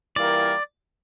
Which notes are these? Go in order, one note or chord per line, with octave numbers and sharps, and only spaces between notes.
E3 G3 A#3 F4 A#4 D5